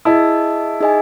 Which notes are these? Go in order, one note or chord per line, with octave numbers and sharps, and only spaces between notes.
E4 G#4 D#5 A5
D#4 G#4 D#5 G#5